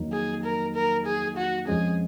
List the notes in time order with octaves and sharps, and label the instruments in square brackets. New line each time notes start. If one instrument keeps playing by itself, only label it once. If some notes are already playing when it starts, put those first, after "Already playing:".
Already playing: [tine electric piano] F2 D#3 F#3 A#3 D#4
[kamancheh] G#4
A#4
A#4
G#4
F#4
[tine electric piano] F2 F3 G#3 C#4 [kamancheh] G#4